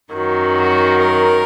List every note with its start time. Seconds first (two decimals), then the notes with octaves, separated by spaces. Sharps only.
0.13 F#2 D#3 F#3
0.55 F#4
0.99 A#4